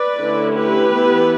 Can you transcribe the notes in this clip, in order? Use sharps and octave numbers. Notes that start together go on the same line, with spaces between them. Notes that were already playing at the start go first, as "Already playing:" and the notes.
Already playing: B4 D5
D3 A3 C#4 E4
G4 B4
E3 B3 E4